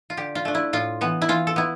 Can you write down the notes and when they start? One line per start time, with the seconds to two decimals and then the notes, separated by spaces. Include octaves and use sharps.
0.10 F4
0.17 D3 G4
0.35 F4
0.45 A3 D4
0.55 E4
0.73 A2 F4
1.01 E3 B3
1.22 E4
1.29 E3 F4
1.47 A4
1.56 B3 E4